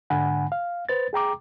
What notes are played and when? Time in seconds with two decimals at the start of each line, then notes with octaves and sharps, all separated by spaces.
0.10 G#2 D3 F#5 G#5 B5
0.52 F5
0.89 B4 C5 A6
1.13 G#4 G5 A#5 D6